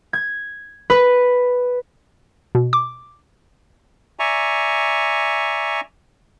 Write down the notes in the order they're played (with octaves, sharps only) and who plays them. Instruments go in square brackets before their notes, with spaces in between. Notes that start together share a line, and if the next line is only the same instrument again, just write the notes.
[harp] G#6
B4
[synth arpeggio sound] B2
D6
[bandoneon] D5 E5 G#5 A#5 C#6